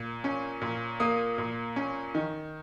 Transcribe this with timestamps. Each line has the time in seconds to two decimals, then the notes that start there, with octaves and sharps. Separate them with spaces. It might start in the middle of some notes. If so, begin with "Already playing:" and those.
Already playing: A#2
0.24 C#4
0.61 A#2
1.00 A#3 D#6
1.38 A#2
1.76 C#4
2.15 D#3